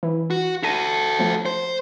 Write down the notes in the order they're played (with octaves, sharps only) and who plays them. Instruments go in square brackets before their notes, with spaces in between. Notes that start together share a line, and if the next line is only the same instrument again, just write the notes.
[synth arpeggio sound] E3
[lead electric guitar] F#4
[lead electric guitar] F#4 A4 [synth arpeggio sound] A#6 D#7
[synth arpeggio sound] F3 A3
[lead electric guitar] C5